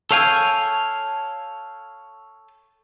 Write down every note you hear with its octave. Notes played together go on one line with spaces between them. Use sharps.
A4 C#5 F5 G5 G#5